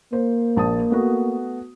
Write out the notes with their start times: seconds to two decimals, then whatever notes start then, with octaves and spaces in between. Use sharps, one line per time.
0.13 A#3 C5
0.57 A#1 A5 D#6
0.90 A3 B3 F#4